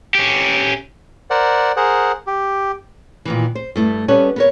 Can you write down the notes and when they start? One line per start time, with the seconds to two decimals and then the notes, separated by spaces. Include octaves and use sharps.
0.15 C#4 G4
1.30 A#4 C5 D5 F#5
1.77 G#4 A#4 C5 F#5
2.27 G4
3.25 A#2 D#3 E3
3.55 C5
3.76 G2 A3 E4
4.08 G3 B3 C#4 A4 B4 C#5
4.36 B3 A#4 C#5